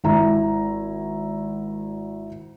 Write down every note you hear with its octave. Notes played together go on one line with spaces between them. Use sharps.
G#1 E4 A#5